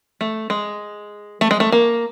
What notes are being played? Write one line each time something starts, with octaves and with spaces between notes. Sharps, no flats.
A3
G#3
A3
G#3
A3
A#3